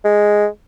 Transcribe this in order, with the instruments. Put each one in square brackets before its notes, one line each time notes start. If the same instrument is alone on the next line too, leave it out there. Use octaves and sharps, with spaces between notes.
[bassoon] G#3